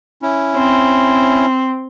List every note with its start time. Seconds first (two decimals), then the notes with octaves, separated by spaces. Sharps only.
0.22 C#4 E4
0.56 C4